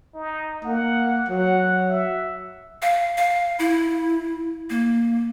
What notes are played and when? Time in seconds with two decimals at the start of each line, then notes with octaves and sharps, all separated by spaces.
0.14 D#4
0.64 A#3 F#5
1.28 F#3 F#5
1.89 E5
2.82 F5
3.17 F5
3.59 E4
4.70 A#3